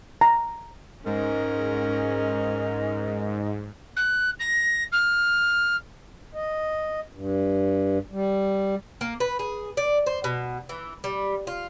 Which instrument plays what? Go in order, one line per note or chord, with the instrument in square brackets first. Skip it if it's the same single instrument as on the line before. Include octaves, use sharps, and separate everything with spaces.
[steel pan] A#5
[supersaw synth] G#2 [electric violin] C#4 [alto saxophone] A#4 [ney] D#5
[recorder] F#6
A#6
F6
[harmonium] D#5
G2
G3
[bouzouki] A#3
B4
G#4
D5
C5
B2
E3
G3
F4